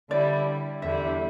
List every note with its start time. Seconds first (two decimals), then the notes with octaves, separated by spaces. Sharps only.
0.10 D3 G3 E4 D5
0.82 E2 D3 G3 E4 E5